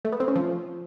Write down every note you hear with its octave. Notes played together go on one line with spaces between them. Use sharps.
A3
B3
C4
C#4
F3